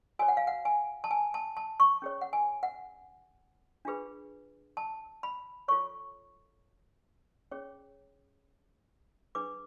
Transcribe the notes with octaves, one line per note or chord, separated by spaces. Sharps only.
F#4 A4 C#5 G#5
F#5
F5
F#5
G#5
A5
G#5
A5
A5
C#6
C#4 G#4 C#5
F#5
G#5
F#5
D4 F4 G#4 B4
A5
B5
F4 A4 C#5 C#6
C#4 G#4 C#5
D4 G#4 B4 D6